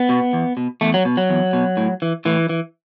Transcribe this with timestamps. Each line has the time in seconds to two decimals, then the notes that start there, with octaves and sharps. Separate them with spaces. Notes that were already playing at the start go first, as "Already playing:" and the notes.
Already playing: B3
0.09 B2
0.33 E2
0.57 B2
0.81 E2 A3
0.94 F#3
1.05 B2
1.17 F#3
1.30 E2
1.53 B2
1.77 A2
2.02 E3
2.25 A2 E3
2.49 E3